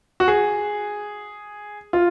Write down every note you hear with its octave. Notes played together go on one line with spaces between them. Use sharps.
F#4
G#4
F4